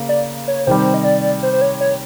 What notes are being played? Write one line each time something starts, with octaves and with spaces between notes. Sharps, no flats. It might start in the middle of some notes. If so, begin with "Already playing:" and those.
Already playing: C#3 A#3
D5
C#5
C3 D#3 G3 C5
D#5
D5
C5
C5
C#5
C#5